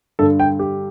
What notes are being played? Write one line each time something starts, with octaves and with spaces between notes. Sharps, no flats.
G2 D3 A4
G5
G4